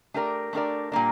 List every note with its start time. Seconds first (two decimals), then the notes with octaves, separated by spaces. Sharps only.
0.14 A3 D4 G4 A#4 D5
0.53 A3 D4 G4 A#4 D5
0.92 A#2 G3 A#3 D4